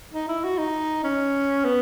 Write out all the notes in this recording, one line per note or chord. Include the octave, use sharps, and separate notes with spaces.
D#4
E4
F#4
D#4
C#4
B3